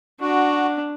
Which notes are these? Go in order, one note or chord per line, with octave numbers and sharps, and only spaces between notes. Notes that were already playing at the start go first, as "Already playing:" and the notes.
D4 F#4